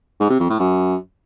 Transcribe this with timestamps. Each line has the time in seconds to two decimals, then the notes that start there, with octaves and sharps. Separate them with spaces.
0.20 G#2
0.30 C3
0.40 F2
0.50 A2
0.60 F#2